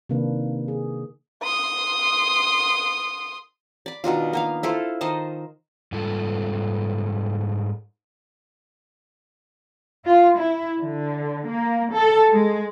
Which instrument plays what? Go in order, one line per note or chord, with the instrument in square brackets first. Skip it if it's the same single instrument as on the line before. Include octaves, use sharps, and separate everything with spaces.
[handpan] C3 D#3 A#3 D4 B4
G#4
[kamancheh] C6 D#6
[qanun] D5 B5
B2 D#3 D4 F4
A#3 B3 F5
E4 F4 A4 C5
D#3 C5 D#5 A5
[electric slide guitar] G#2 G3 F4 A4
[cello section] F4
E4
D3
A#3
A4
G#3